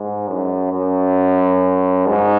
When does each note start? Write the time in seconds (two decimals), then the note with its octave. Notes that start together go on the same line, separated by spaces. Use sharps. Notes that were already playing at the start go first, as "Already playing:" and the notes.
Already playing: G#2
0.28 F#2
0.72 F#2
2.07 G#2